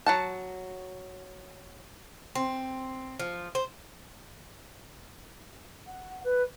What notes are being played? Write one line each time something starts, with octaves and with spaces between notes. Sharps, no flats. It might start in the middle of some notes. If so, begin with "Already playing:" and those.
F#3 F#5 A5
C4
F3
C5
F#5
B4